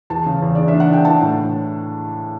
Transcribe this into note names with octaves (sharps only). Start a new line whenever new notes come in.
E2 A5
C#3
E2
D4 D5
E5
D4
F#5
D4 G5
E3 A5
A2